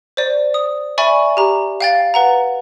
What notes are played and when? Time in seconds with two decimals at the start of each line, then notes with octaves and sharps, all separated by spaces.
0.17 C5 D5
0.54 D#6
0.98 D5 E5 G#5 B5 C#6
1.37 G4 A#5
1.81 F5 G5 A6
2.14 B4 F#5 A#5